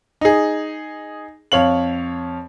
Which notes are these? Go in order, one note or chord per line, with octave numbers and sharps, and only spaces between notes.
D#4 G#4
F2 C#5 F5 F#7